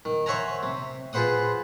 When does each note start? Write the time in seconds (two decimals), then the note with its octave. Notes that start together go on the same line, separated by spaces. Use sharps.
0.05 D#3
0.26 C5 C#5 E5 F#5 G#5 A#5
0.63 C3
1.13 F4 G#4 B4 C5 F#5 D#6